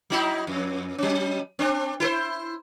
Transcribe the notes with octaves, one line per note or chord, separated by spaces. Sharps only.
F#3 D#4 E4
F2
F#3 C#4
C4 D4
E4 A4 C5